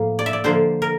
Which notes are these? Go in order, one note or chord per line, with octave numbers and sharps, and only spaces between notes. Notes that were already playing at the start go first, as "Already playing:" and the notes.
Already playing: A2 F3 A#3
D5
E5
D5
D3 F3 A#3 C5
A#4